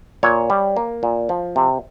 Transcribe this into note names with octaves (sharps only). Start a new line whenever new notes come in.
A#2 C#5
G3
A#3
A#2
F3
C3